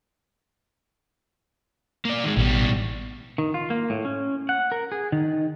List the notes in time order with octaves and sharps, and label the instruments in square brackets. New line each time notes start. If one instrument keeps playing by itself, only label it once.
[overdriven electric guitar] A#3 D5
D#3 G#3
[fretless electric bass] A1 [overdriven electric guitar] B2 G3
[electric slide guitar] D#3
F4
A#3
A2
C#4
F#5
A#4
G#4
D#3